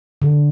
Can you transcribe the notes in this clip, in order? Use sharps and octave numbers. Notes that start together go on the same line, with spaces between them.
D3